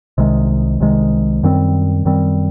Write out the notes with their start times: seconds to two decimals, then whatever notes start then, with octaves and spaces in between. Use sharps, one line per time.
0.18 C2 C3 D#3 G#3
0.80 C2 C3 D#3 G#3
1.43 F#2 D#3 G3 C4
2.05 F#2 D#3 G3 C4